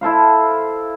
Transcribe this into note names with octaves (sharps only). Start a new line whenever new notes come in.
E4 A4 C5 F5